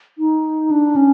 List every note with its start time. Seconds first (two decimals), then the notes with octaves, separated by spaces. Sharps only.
0.18 D#4
0.71 D4
0.96 C#4